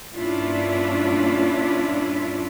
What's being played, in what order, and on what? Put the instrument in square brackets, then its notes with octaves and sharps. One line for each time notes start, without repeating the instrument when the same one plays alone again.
[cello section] G2 A#2 C#4 D4 E4 F4